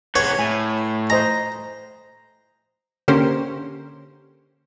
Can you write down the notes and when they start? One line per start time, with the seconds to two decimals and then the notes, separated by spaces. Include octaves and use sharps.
0.16 C3 G#4 B4 C#5 F#5
0.39 A2 G#5
1.10 C5 D#5 G#5 A#5
3.08 D3 A#3 C#4 G4 A#4 C5